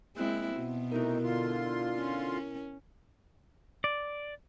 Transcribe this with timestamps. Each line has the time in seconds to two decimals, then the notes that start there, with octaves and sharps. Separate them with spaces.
0.16 G#3 A#3 C4 E4 F#6
0.56 B2 F#4
0.92 C3 A3 D#4 E4 A#4
1.24 D3 F4 C6
1.97 C#4
3.84 D5